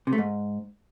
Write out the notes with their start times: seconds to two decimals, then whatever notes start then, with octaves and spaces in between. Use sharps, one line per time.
0.07 C3
0.13 A3
0.18 G#2